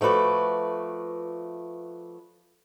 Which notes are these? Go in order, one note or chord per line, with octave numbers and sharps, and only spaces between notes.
F3 A3 F#4 B4 D5